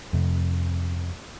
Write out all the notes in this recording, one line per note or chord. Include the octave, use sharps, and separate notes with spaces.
F2 C3